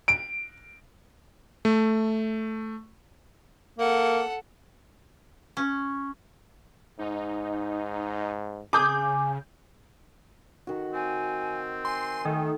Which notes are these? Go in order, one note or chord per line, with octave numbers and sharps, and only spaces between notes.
D7
A3
A#3 A4 F#5
C#4
G#2 D#4
C#3 G#4 D6 G6
D#3 F#4
C4 G#5
G#5 C6
D#3 A3